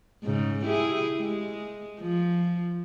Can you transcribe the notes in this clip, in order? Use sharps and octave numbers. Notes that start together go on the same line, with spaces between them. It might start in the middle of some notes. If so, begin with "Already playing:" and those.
G#2 C#3
E4 G4 G#4
G#3
F3